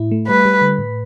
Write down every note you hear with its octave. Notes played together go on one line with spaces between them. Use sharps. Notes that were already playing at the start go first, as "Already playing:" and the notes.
Already playing: A2 E4
A3
G3 B4
G3
D3
A2